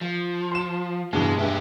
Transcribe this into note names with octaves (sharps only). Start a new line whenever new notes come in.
F3
C6 E7
G2 B2 E3 G#3
G2 G#3 G4 E5